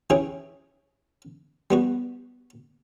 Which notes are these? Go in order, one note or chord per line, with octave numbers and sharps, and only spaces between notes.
E3 C#4 E4 G#4 G5
G3 B3 F#4